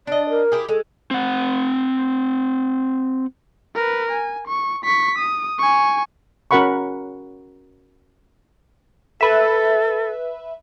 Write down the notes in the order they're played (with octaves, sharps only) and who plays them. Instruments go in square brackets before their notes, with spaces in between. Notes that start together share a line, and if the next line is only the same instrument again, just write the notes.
[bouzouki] D4 D#5 [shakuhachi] D5
[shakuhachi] A#4
[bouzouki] E4 G4 G#4
[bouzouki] G#3 [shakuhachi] A4
[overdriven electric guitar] C4 F#5
[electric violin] A#4 B4
G#5
C#6
C#6 B6
D#6
G#5 C#6
[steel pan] C#4 F#4 A#4 F#5 B5 C#6
[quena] A4 [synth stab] B4 E5